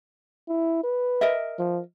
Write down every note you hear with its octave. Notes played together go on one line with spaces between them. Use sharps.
E4
B4
A#4 D#5 E5
F3